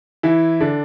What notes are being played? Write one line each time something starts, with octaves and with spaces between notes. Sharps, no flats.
E3 E4
D3 D4